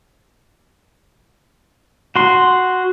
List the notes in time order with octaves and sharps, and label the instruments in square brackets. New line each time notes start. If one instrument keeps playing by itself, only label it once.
[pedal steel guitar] F#4 C6